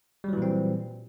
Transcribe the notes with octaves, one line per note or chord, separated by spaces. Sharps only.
A#2 E3 F#3 G3 C4